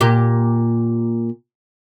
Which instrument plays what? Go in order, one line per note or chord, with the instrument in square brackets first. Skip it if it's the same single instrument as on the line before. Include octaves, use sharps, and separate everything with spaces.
[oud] A#2 G4